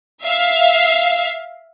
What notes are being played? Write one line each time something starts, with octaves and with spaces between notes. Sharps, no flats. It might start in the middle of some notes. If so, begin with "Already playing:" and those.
E5 F5